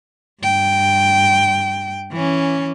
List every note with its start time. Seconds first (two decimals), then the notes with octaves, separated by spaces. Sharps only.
0.42 G2 G5
2.12 E3 C#4